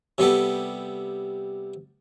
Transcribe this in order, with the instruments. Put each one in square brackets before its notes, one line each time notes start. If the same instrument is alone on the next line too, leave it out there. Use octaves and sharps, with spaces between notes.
[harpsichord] C3 G3 B3 A4